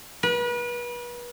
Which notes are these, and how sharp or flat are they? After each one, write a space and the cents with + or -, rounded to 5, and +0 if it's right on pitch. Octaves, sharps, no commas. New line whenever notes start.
B4 -35